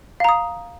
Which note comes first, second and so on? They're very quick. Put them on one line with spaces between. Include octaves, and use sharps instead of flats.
F5 A#5 D#6